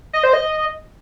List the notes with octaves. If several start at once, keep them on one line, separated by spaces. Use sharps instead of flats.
D#5
C5
D#5